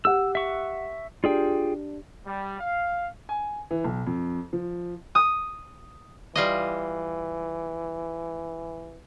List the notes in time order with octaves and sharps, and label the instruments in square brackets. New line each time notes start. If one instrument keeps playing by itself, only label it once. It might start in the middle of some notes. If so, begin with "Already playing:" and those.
[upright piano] G4 F#5 [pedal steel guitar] E6
[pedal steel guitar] E5 C#6
[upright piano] D4 G4 [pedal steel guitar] F4 G#4 G5
[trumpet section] G3
F5
[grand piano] G#5
E3
B1
F2
F3
[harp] D#6
[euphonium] E3 [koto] G3 F4 D#5